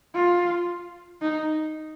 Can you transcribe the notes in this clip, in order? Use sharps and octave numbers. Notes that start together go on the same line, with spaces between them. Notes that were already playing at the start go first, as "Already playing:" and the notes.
F4
D#4